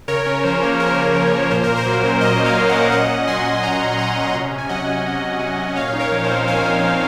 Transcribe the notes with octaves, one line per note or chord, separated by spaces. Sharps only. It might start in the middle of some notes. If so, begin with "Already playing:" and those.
C#3 A#4 C#5
C#4
F3 C5
A#3
C#3 A#4
C#4
F3
A#3
A#2 C5
A#2 A#4
C5
F#3
C#4
A#2 C5 D#5
A#2
C#5 F5
F#3
D#5 F#5
C#4
A#2 D#5 F#5
A#2
F#3 G#5 C6
C#4
G#5
A#2 F#5 A#5
A#2
F#3 F#5 A#5
C#4
C3
C3
G#5
F#3 D#5 F#5
C#4
C3
C3
F#3
C#4
A#2 C#5 F5
D#4
A#4 C#5
F3
C5
C4
A#2 F5 G#5
D#4
F3